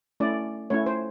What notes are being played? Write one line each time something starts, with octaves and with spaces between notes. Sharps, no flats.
A3 C#4 E4 D5
A3 C#4 E4 C#5
C5